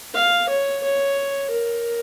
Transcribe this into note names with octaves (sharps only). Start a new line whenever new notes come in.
F5
C#5
C#5
A#4